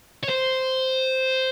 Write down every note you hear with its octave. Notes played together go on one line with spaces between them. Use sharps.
C#5
C5